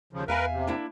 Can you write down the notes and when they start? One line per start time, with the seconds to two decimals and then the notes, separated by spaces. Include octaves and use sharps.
0.13 D#2 C#3 F3
0.28 E2 A#4 B4 E5 F5 G#5
0.52 C3
0.67 A#3 D4 E4